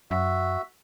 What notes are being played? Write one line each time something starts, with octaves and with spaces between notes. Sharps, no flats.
F#2 F#4 E5